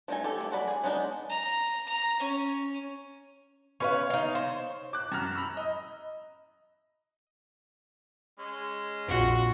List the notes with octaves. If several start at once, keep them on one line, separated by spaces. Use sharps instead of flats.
F3 A3 C4 D#4 G#5
G4 A4
A3 A#3
F#3 F#4 D5 B5
G#4 G#5
F#3 G#3 B3 D4 D#4
A#5
A#5
C#4
C#4 B4 C#5 F5
D#4 F5
C5
D6 F#6
F#2 A#5 F6
A#5 B5 E6
D#5
G#3 C#4
A#1 F2 F4 F#4 C6